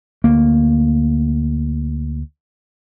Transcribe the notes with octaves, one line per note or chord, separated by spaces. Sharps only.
D2 A#3